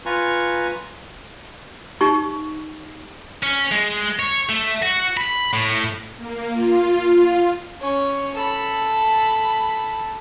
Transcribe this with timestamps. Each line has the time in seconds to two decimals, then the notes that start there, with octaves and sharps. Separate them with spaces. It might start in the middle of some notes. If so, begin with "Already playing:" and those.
0.06 F4 B4 G#5 A#5 C#6
2.01 D#4 G4 C#6
3.43 C#4
3.71 G#3
4.19 C#5
4.49 A3
4.82 F#4
5.17 B5
5.53 A2
6.17 A#3
6.53 F4
7.80 C#4 C#5
8.35 A4 B5